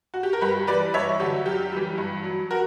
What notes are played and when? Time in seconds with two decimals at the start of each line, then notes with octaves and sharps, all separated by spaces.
0.14 F#4
0.23 G4
0.33 A#4
0.41 G2 G4 B4
0.67 E3 G3 B4 D5
0.94 G2 C#5 E5
1.20 D3 F#3 G4
1.46 F#2 G4
1.72 E3 G3
1.98 G2
2.24 F#3
2.51 F#4 A#4